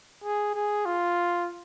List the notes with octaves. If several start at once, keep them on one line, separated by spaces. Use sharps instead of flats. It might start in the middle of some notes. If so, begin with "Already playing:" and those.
G#4
G#4
F4